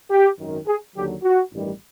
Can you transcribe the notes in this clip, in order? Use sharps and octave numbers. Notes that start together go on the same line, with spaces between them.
G4
G#1 F#2 D#3
G#4
D#2 D3 F#3 G4
F#4
A1 G2 D#3 G3